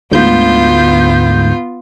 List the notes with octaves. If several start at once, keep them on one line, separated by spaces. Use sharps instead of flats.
D2 G#2 B3 F4 G6